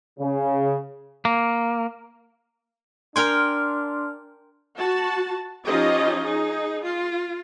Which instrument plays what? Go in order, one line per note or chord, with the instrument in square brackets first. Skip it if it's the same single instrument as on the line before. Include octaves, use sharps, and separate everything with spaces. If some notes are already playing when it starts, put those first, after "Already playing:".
[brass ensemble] C#3
[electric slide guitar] A#3
[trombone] D4 [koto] A#4 G5 G#5 [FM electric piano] C6 F6
[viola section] F#4 A5
F3 C#4 D#4 F4 G4 D#5
D#4 G#4
F4